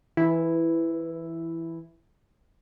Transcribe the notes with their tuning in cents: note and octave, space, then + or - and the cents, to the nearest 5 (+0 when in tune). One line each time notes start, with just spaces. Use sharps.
E3 +5 E4 +0